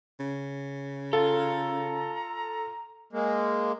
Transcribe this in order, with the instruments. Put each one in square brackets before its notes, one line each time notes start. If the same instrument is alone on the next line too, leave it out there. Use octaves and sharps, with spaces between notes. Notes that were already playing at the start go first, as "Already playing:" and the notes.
[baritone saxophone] C#3
[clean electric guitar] F4 [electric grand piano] A4 [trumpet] A#5
[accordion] G#3 A#3